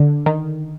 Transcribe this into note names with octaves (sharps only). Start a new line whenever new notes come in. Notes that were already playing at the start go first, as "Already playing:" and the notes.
Already playing: D3
D#3